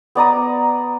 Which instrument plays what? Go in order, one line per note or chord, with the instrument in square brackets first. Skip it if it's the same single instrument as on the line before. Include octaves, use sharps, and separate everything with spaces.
[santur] B3 D5 A#5 D#6